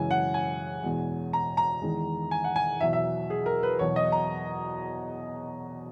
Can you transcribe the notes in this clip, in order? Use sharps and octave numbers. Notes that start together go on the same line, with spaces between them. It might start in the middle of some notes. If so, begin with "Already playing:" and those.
Already playing: F#2 C#3 E3 G#3 G#5
F#5
G#5
E2 B2 G#3
A#5
A#5
E2 D#3 G#3
G#5
F#5
G#5
E2 B2 F#3 E5
E5
G#4
A#4
B4
E2 B2 F#3 C#5
D#5
A#5